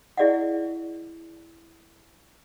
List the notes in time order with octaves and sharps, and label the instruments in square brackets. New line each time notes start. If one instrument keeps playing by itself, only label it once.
[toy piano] E4 G#4 D5 D#5 F5 F#5